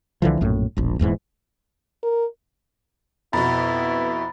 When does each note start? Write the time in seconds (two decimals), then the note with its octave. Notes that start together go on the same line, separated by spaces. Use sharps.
0.22 C2 D3 E3 F3
0.41 A#1 F#2 A2
0.77 E1 A#1
0.99 D#1 E2 G#2 E3
2.03 A#4
3.33 F2 B2 B3 E4 A#5 B5 A6